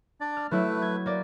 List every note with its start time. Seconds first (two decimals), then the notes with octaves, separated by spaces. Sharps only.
0.21 D4 D5
0.37 F6
0.51 F#3 A3 E4 B4
0.82 G#6
1.06 A#3 D5